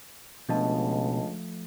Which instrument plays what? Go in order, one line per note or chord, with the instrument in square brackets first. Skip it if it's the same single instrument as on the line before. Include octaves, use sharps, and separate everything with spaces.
[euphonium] C#2 [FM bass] B2 [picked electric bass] F3 A3 [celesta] D4 D#5 A5